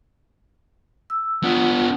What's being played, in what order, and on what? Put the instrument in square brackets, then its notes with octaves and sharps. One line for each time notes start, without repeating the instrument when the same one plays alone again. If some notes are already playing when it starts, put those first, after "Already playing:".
[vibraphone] E6
[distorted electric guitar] B3 D4 [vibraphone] F4 F#5 D#6